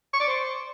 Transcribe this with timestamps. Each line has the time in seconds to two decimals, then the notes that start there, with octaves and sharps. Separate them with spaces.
0.13 C#6
0.20 D5
0.27 C5